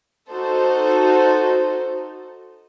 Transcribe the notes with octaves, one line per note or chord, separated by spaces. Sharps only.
D#4 F#4 A4 C5